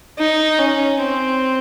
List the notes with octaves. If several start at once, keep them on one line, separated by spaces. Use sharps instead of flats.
D#4
C#4
C4